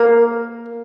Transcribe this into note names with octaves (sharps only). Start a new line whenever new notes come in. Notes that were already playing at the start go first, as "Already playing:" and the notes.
Already playing: A#3